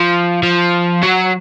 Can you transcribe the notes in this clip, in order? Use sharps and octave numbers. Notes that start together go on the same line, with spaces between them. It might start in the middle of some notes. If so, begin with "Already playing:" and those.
Already playing: F3
F3
F#3